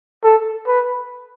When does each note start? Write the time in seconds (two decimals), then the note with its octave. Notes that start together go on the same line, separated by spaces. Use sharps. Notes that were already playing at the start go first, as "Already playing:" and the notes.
0.24 A4
0.68 B4